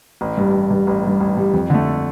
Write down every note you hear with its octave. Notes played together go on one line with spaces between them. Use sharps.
A1
G2 G3
A1
G2 G3
A1
G2 G3
A1
G2 G3
F2
D3 A3